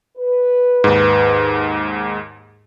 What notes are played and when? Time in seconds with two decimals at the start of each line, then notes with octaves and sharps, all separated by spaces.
0.17 B4
0.84 D#2 G#2